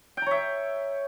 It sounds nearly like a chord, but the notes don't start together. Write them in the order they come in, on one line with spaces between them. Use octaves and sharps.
G5 A#5 C#5 E5